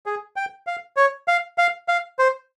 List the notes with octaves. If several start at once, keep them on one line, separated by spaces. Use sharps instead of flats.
G#4
G5
F5
C#5
F5
F5
F5
C5